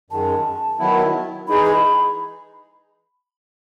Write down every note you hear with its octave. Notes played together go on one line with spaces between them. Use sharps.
F#2 D#3 G#3 A5
D#3 F#3 B3 E4
E3 G#3 D#4 G#4 B5
B5